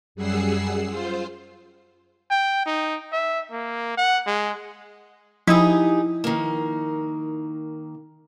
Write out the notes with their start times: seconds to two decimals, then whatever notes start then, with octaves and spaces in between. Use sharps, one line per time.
0.15 F#2 G3 G#4 F#5 E6 C7
0.89 F4 C5
2.31 G5
2.66 D#4
3.13 E5
3.52 A#3
3.98 F#5
4.27 G#3
5.47 F3 D#4 E4 G4 G#4 D#6
6.24 D#3 A#3